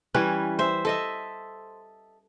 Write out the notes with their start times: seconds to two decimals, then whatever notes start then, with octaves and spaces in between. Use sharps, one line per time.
0.14 E3 G3 C#4 B4
0.59 C5 E5
0.85 A4 D#5 E5